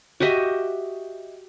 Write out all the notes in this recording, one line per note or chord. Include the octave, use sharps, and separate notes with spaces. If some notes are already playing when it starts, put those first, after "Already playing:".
F#4 G4 D#5 E5